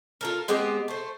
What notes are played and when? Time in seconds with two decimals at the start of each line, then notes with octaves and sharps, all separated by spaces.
0.21 F4 A4 A#4
0.48 G#3 B3 C4 G4
0.88 A3 C5